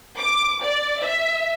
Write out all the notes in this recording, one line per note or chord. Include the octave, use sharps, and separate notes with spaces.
D6
D5
E5